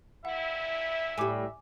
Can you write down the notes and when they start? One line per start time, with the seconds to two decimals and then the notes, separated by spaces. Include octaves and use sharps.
0.25 G2 A#2 E4 E5 F#5
1.18 A2 G3 G#5 D6